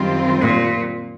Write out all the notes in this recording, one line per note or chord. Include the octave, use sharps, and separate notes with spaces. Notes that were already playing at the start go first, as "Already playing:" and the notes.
Already playing: F#2 D#3 G3 C4 F4
A#2